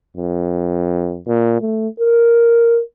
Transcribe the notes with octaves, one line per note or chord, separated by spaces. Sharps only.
F2
A#2
A3
A#4